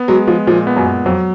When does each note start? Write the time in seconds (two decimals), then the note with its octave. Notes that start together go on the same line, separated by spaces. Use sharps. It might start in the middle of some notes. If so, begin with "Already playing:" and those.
Already playing: B3
0.08 F#3 G#3
0.27 F3 G#3
0.47 A#2 F3
0.67 B3
0.77 F#2
0.86 B3
1.06 F2 F#3